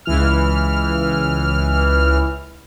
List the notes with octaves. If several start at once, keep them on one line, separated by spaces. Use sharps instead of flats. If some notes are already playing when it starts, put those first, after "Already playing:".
C#2 E3 F6